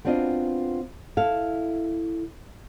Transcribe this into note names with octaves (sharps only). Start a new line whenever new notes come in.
B3 C4 D4 F4 F#4 D#5
E4 A4 E5 F5